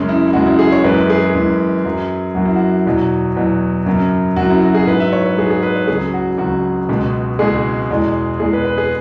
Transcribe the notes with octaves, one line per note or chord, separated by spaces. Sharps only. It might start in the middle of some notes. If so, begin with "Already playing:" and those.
Already playing: F#2 C#3 G#3 C#4
E4
E4
F#2 C#3 G#3 F#4
E4
G#4
C#5
F#2 E3 G#3 B4
G#4
F#2 E3 G#3
F#2 F#3
F#2 F#3 F#4
E4
F#4
E2 B2 F#3
E2 B2 F#3
F#2 C#3 F#3
F#2 C#3 F#3 F#4
E4
F#4
G#4
G#2 F#3 B4
E5
C#5
B4
G#2 F#3 G#4
G#4
B4
C#5
C#2 C#3 F#3 G#4
F#4
C#2 C#3 F#3 F#4
C#2 B2 G#3
C#2 B2 G#3 G#4
E2 B2 G#3
E2 B2 G#3 G#4
B4
B4
G#4